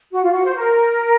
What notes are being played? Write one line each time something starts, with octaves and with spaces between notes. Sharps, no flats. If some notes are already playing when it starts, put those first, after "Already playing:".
F#4
F4
F#4
C5
A#4